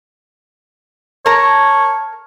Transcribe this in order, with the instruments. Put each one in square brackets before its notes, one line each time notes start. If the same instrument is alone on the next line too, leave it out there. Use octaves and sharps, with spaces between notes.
[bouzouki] A#4 A5 A#5 [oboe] C#5